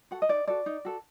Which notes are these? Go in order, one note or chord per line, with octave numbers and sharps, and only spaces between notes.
F#4 A4 F#5
D#5
D#4 D5
F#4 A4 D5
D#4
F#4 A4